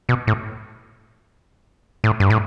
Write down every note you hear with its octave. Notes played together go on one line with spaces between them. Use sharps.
B2
A2
A2
G2
A2